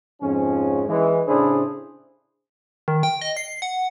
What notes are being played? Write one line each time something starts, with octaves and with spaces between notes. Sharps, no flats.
F2 G#2 F3 C#4
E3 G#3
A2 C#3 D4 E4 G#4 C5
D#3
G5
D#5
C7
F#5